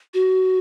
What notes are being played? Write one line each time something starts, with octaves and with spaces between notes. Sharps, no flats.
F#4